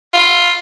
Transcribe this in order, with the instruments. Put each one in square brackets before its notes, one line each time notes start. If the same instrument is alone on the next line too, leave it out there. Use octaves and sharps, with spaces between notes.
[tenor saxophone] F4